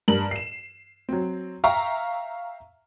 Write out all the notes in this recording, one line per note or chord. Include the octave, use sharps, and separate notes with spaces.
G2 A#4 F#7
C7 E7
F#3 C4
E5 F5 G5 A#5 C#6